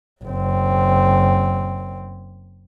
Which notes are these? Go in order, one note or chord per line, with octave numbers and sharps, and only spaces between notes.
F#1 C4